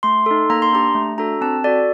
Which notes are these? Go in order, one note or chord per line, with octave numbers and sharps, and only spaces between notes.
A3 C6
D#4 A4
A#3 A#5
C6
D4 G4 A#5
A3
D4 F#4 A4 A#5
C4 A5
F#4 A4 D5